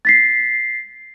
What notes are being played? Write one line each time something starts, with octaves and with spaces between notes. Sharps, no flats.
A6 B6 C7